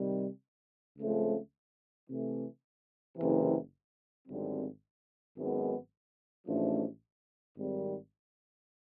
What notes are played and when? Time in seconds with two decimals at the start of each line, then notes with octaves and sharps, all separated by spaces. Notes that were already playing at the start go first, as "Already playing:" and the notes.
Already playing: C3 D#3 G3
0.97 C#2 C#3 F3 A3 C4
2.08 C3 E3 A3
3.17 F#1 E2 C3 E3
4.27 G#1 F#2 D3 G3 C4
5.36 G#1 F#2 D#3 G#3 B3
6.47 A1 G#2 F3 A3 D4
7.56 G#1 G#2 D#3 G3 C4